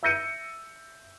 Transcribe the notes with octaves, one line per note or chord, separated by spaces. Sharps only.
E5 E6 G6 A#6 C#7 D#7